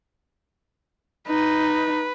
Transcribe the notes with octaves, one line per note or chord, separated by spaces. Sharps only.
D#4 B4